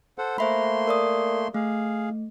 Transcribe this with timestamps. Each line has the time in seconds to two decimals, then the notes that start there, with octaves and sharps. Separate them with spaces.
0.18 A4 C5 F#5
0.38 A3 A#3 C5 E5 B5 C6
0.87 A#4 D5 D#6
1.54 A3 G#4 F5